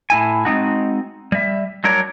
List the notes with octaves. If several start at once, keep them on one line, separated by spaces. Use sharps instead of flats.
A2 E4 G#5
G#3 C4 D#4 F#4
G3 E5
F#3 G3 D4 A#4 C#5